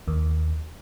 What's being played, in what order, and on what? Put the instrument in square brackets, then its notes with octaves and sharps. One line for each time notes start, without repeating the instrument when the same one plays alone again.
[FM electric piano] D#2